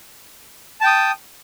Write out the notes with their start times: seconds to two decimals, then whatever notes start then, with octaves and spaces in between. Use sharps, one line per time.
0.81 A5
0.84 G5
0.87 D#6